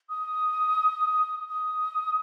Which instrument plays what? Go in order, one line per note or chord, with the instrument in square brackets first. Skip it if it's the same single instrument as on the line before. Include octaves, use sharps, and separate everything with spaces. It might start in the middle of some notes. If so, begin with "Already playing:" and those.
[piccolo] D#6
D#6